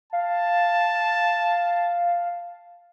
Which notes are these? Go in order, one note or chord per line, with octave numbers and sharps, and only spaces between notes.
F5 A5